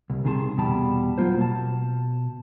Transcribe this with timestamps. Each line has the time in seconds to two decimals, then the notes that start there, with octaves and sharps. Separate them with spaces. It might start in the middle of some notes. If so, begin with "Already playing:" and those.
0.10 C2
0.24 C2 C3 D#3 G#4 A5 C6
0.57 E2 B2 G3 G5 A5 B5
1.18 F#3 A3 A#3 F4 C5
1.36 B2 A5